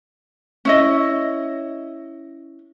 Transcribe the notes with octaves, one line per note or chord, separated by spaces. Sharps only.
C#4 E4 D#5